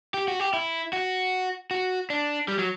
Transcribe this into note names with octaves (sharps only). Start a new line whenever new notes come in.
G4
F#4
G4
E4
F#4
F#4
D4
G3
F#3